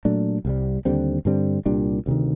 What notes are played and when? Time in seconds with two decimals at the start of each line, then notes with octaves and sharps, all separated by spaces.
0.05 A#2 F#3 A3 D4
0.45 C2 C3 G3
0.85 D#2 D3 G3 C4
1.25 G2 D3 G3 C4
1.66 C2 A#2 G3 D4
2.06 D2 C3 D#3